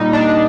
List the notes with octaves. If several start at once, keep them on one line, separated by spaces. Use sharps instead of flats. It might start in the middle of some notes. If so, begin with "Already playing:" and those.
Already playing: A#2 G3 D#4
D4